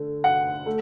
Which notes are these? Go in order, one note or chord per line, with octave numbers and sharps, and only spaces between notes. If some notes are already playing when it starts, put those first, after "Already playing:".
Already playing: D3 A3
F#5
A3